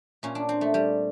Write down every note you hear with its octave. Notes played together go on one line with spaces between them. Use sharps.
A#2 C#4
D4
C4
A3
G3